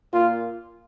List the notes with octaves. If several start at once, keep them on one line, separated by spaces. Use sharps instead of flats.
A#2 A#3 F4